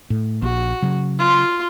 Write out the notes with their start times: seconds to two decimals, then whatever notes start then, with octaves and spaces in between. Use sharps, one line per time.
0.10 A2
0.42 A#1 F#4
0.82 C#3 F#3
1.19 F4 C6